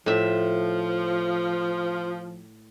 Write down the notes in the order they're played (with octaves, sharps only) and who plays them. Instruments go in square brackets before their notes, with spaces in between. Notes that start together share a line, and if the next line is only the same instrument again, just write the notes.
[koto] A2 E5 [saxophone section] F3